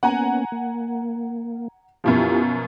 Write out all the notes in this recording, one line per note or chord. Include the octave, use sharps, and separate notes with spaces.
A#3 B3 C#4 F#5 G#5 A#5
A#3
F#2 B2 F3 E4 F4 G4